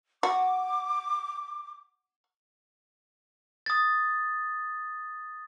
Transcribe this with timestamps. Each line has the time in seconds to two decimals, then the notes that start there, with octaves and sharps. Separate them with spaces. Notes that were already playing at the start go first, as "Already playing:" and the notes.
0.23 F#4 D6
3.66 D#6 A6